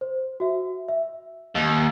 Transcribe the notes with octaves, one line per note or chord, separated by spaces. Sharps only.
C5
F#4 E5
E5
D#2